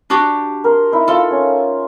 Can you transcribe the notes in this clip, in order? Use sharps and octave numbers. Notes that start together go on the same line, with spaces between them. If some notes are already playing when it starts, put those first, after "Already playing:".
D4 F#4 G4
A#4 C6
D#4 E4
F4 A4
C#4